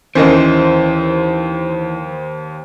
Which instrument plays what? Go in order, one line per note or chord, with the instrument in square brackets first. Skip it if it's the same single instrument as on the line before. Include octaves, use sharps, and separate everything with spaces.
[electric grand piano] D#2 C5 [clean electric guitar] E3 [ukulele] C#4 A#4 D#5